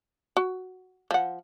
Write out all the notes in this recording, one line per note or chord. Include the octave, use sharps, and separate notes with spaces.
F#4
F3 F#5